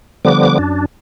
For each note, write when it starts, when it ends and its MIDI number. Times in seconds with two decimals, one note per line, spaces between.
0.25 0.58 50
0.25 0.58 53
0.25 0.58 55
0.25 0.58 59
0.25 0.58 86
0.59 0.85 42
0.59 0.85 62